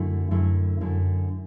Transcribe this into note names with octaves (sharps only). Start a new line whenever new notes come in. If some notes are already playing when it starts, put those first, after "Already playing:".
Already playing: F#2 D3 A3 E4
F#2 D3 A3 E4
F#2 D3 A3 E4